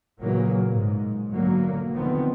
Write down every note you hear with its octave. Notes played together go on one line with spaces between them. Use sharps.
A#2 C#3 E3 F#3 A#3
G#2
B2 D3 F#3 A#3
D3 D#3 F3 B3 C4